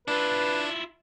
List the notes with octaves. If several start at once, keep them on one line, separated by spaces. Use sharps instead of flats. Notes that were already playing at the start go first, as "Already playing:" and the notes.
D4 E4 F4 B4